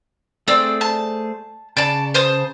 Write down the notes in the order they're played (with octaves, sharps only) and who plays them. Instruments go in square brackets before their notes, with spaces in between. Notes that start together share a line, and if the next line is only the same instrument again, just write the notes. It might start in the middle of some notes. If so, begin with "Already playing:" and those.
[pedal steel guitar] A3 G#4 C5 [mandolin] C4 D5 E6
[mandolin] A5
[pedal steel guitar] C#3 [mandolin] D5 A5
[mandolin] C5 A5 D#6